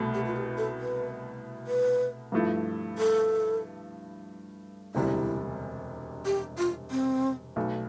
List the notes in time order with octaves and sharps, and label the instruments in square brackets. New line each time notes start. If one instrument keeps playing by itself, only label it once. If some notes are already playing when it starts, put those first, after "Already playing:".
Already playing: [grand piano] C2 B2 A3
[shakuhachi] G4
F4
G4
A4
B4
B4
[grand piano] G2 F3 A3 E4
[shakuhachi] A4
[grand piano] E1 D2 C3 G3 [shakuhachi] E4
[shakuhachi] G4
F4
C4
[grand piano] B1 B2 A3